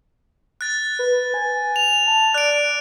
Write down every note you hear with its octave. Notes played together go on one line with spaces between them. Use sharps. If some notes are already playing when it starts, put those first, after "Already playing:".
F#6 A6
B4
G#5
F7
A5
D5 F#6 D7